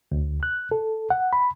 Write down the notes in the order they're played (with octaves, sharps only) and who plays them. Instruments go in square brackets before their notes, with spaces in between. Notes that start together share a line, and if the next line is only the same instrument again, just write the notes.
[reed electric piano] D2
F#6
A4
F#5
B5